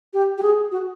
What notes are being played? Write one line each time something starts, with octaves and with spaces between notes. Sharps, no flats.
G4
G4
G#4
F#4